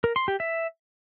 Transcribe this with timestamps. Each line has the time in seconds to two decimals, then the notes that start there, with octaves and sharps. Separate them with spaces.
0.04 A#4
0.16 C6
0.28 G4
0.40 E5